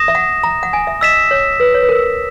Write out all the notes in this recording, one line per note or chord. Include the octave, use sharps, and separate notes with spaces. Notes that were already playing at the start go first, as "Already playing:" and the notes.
Already playing: D#6 A#6 E7
E5
F#5
A#5
F#5
G#5
E5
D#5 E6 B6 E7
C#5
B4
C#5
B4
A#4
A#4